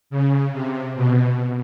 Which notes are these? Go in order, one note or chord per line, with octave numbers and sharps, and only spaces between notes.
C#3
C3
B2